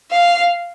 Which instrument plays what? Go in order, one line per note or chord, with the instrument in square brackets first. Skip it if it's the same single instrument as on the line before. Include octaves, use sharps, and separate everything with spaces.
[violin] F5